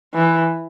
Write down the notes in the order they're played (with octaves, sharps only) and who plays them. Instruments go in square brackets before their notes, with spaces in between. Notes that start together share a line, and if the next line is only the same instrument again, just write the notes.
[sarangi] E3